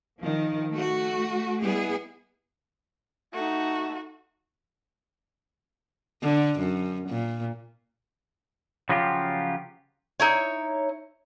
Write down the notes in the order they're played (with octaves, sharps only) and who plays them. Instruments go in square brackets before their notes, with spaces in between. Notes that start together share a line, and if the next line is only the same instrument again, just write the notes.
[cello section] D#3 F3
A3 F#4
G3 G#3 B3 E4 G#4
[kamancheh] A3 D#4 [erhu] F#4
[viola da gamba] D3
F#2
A#2
[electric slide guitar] C#3 F3 F#3 C#4 F4 G4
[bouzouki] D#4 E4 C#5